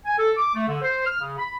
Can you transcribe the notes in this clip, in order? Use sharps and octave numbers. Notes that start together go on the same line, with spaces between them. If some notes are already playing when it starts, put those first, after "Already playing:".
G#5
A4
D6
A3
D3
C5
F6
C#3
B5